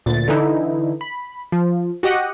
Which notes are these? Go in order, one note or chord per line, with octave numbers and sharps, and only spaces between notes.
D2 A#2 A6
D3 E3 D#4 E4
B5
F3
F#4 G4 D#5 F#5